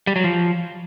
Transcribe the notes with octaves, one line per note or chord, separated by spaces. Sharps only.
G3
F#3
F3